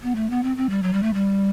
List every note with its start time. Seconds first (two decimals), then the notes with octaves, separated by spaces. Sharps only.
0.03 B3
0.16 A3
0.30 B3
0.43 C4
0.57 C4
0.70 G3
0.83 F#3
0.93 G3
1.03 A3
1.14 G3